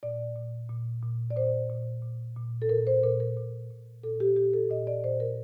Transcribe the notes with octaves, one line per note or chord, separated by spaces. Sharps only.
A#2 D5
A#2
A#2
A#2
D5
A#2 C5
A#2
A#2
A#2
A4
A#2 A#4
C5
A#2 A#4
A#4
A#2
A#2
A#2 A4
G4
A#2 G4
A4
A#2 D#5
D5
A#2 C5
A#4